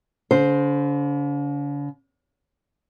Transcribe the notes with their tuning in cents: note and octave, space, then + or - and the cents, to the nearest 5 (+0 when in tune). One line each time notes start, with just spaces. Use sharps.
D3 -45 C5 +0